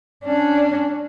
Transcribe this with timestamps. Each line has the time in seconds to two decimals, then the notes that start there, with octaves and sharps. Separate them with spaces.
0.24 C#4 D4